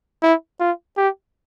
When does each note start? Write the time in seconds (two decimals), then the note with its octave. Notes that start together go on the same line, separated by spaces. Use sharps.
0.22 E4
0.60 F4
0.97 G4